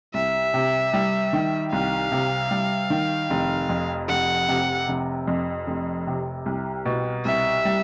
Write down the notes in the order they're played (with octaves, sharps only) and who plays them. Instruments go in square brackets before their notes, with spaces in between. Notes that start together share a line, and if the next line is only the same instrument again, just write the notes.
[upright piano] C2 [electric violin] E5
[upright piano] C3
G3
D#3
[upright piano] C2 [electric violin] F5
[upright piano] C3
G3
D#3
F1
F2
[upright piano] F1 [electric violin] F#5
[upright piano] C3
F1
F2
F1
C3
C2
B2
[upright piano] C2 [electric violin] E5
[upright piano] G3